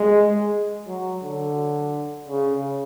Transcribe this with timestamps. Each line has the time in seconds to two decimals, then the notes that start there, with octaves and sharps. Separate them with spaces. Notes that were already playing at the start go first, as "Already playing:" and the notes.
Already playing: G#3
0.88 F#3
1.23 D3
2.28 C#3